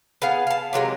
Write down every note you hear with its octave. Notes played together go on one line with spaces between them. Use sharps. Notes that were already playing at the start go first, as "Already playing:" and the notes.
B3 G#4 F5
F5 A5
C3 F#3 G#3 A#3